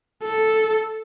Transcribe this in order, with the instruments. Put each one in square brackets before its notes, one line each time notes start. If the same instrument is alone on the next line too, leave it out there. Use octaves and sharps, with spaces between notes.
[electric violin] A4